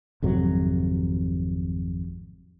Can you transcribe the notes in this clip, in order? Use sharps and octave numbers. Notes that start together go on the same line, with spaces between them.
G#1 F2 C3 F#3